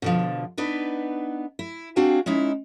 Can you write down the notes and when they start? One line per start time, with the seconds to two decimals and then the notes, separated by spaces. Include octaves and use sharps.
0.02 B2 D3 F3
0.58 B3 D4 D#4 B4
1.59 E4
1.96 C4 D4 F#4 G#4 F5 G5
2.26 G#3 C#4 D#4 E4